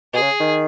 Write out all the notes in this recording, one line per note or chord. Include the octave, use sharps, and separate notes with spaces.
B2 G#4
C#3
D#3